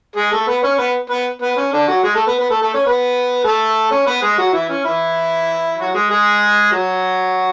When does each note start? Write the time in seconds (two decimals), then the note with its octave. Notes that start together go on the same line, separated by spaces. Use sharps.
0.16 G#3 G#4
0.32 A3 A4
0.47 B3 B4
0.63 C#4 C#5
0.79 B3 B4
1.10 B3 B4
1.42 B3 B4
1.57 C#4
1.73 D3 D4
1.88 F#3 F#4
2.03 G#3 G#4
2.15 A3 A4
2.27 B3 B4
2.39 B3 B4
2.50 A3 A4
2.62 A3 A4
2.74 C#4 C#5
2.85 B3 B4
3.44 A3 A4
3.91 C#4 C#5
4.07 B3 B4
4.22 G#3 G#4
4.38 F#3 F#4
4.53 E3 E4
4.70 C#4
4.85 E3 E4
5.78 F#3 F#4
5.94 G#3 G#4
6.10 G#3 G#4
6.72 F#3 F#4